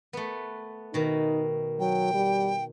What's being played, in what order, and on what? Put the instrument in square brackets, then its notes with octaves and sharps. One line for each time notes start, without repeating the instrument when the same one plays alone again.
[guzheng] A3 B3
[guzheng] B2 D#3 [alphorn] D#4
[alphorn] F#3 [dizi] G5
[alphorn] G3